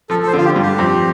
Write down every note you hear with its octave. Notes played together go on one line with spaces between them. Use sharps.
F3 A4
A4
C5
D3 F4
G4
G2
G4
F2